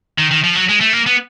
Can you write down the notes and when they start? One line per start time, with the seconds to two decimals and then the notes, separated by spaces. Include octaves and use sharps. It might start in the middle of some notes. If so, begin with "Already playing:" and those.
0.18 D#3
0.31 D#3
0.44 F3
0.56 F#3
0.69 G#3
0.81 A3
0.93 A#3
1.06 B3